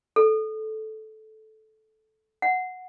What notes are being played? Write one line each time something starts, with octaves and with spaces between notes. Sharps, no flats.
A4
F#5